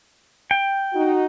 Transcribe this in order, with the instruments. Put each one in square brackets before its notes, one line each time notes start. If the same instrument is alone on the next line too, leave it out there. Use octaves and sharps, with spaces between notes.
[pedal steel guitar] G5
[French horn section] D#4 F#4